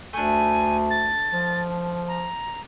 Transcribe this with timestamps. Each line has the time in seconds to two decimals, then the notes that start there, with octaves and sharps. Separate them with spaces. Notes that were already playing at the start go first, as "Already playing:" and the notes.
0.13 D2 A3 D4 G#5
0.90 A6
1.33 F3
2.08 A#5